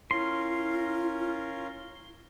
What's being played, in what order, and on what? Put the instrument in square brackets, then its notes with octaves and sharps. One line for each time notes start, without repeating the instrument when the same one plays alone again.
[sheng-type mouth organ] C#4 F4 A#4 [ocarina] E4 [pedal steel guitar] C6